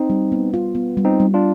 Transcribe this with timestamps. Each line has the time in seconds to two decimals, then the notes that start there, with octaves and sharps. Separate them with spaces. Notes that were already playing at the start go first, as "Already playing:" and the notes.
Already playing: C4 D#4
0.10 G3
0.32 B3
0.54 F4
0.75 B3
0.97 G3
1.05 C4 D#4
1.20 G3
1.34 D4 F4